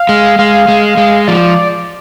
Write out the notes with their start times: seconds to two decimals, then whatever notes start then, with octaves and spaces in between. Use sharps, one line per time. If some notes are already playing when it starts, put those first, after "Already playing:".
Already playing: F5
0.09 G#3
0.39 G#3 F5
0.68 G#3
0.97 G#3
1.27 F3 D5